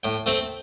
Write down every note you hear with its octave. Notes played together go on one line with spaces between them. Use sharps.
A2 G5
A3 C4 G5